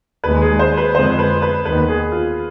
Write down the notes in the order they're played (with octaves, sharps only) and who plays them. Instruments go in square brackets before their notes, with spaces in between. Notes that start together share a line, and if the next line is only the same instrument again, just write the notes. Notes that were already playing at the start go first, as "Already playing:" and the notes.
[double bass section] D#2 D#3 G#3 [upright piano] B4
[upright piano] G#4
C5
B4
[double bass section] F2 D3 G#3 B3 [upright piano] C5
[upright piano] B4
B4
[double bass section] D#2 D#3 B3 [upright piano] B4
[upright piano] G#4
F4